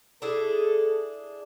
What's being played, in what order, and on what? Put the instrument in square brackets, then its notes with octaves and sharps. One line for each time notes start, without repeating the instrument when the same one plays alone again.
[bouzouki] D4 E4 G#4 [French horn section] A4